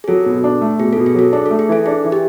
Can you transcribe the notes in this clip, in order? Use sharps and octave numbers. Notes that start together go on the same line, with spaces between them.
G#4
F#3 A4
B2
D4
A3
B2 G#4
B2 A4
G#4
F#3 A4
D4 G#4
A3 A4
G#4
E3 A4
D4 G#4
E3
G4